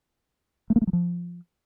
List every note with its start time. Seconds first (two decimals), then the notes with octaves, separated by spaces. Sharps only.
0.70 A3
0.76 A#3
0.82 A3
0.87 F#3
0.93 F3